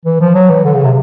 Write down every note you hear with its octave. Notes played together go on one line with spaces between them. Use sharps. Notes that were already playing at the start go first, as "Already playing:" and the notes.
E3
F3
F#3
E3
D3
C#3
C3